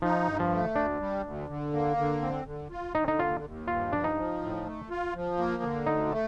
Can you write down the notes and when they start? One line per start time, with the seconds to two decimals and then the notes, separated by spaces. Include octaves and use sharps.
0.02 F3 D#4
0.27 G2
0.40 F3
0.52 A3
0.76 D2 D4
1.00 G3
1.24 D2
1.49 D3
1.73 A#3
1.97 D3
2.22 C4
2.46 D3
2.71 F4
2.95 D3 D#4
3.08 D#4
3.19 D#2 F4
3.43 D#2
3.68 G2 F4
3.92 F3 D4
4.04 D#4
4.16 F3
4.41 A2
4.65 A3
4.90 F4
5.14 F3
5.38 A#3
5.63 D3
5.86 D2 D#4
6.11 A3